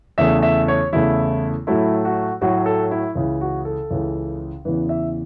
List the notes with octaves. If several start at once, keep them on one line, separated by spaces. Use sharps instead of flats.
E2 C#3 A3 E5
E5
C#5
E2 C#3 A3 E4
A2 F#3 A3 E4
F#4
A2 F#3 A3 F#4
A4
E4
C#2 C#3 E3 E4
F#4
A4
C#2 C#3 E3
E2 C#3 E3 B4
E5